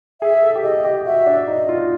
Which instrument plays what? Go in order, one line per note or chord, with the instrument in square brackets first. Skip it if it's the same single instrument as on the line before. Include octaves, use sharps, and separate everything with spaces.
[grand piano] G#4 [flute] E5
[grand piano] A4
G4
[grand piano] G#4 [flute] D#5
[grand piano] G4
[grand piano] F#4 [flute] E5
[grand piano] D4
[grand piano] D#4 [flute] D#5
[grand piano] F4